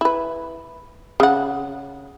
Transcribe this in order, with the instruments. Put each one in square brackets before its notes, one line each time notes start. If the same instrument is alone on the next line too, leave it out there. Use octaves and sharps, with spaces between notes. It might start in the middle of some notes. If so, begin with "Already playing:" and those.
[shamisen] E4 B4
C#3 F#5